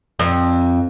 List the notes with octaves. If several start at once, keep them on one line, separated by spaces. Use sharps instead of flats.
F2